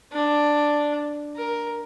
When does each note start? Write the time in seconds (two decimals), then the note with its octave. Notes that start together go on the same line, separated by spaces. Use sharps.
0.12 D4
1.36 A#4